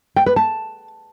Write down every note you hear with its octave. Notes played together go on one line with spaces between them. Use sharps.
G5
B4
A5